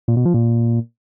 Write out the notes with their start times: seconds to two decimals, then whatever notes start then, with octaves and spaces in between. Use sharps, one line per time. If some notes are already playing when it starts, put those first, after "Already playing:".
0.08 A#2
0.17 B2
0.25 F3
0.34 A#2